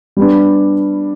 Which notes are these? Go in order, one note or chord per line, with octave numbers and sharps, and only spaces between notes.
G3 B3 D4